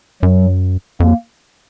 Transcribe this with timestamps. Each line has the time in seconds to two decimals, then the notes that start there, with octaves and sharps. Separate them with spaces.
0.23 F#2 F#3
1.00 F2 A#3